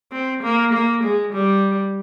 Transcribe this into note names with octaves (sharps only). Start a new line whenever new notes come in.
C4
A#3
A#3
G#3
G3